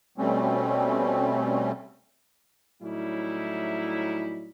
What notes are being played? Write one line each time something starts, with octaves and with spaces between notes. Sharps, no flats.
B2 G3 A3 C4 C#4
A2 F#3 G3 C#4 D#4 E4